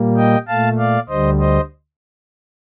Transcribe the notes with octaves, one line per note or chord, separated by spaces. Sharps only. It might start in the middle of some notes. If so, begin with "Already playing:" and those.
Already playing: A#2 G3 A#3
D#5 G5
A#2 A3 F5 A5
D5 F5
D2 D3 G3 C5 D#5
C5 D#5